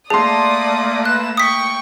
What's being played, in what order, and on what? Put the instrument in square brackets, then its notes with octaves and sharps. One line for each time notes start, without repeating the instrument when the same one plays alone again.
[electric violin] A3 A#3 [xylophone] G#4 [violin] D5 D#6 [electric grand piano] A5 C6
[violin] B4 E7 [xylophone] F#6
[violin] G5 C#6 [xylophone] D#6 B6